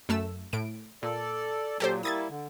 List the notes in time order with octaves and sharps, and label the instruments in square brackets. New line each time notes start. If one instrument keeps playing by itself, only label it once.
[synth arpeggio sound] F#2 A3 E6
A2 D7
[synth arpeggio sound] A#2 [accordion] A4 D5
[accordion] A#2 F#3 [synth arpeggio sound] G4 A4 C5
[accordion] G3 A#3 E4 [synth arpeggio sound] D#6 G#6 A6
[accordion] D3